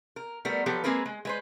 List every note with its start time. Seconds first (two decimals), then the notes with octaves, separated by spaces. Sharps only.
0.16 A#4
0.45 G3 A3 B3 A#4
0.66 F3 F#3 B3 G4 A4
0.84 G#3 A#3 C4 G#4 A#4 B4
1.06 G#3
1.25 G#3 B4 C5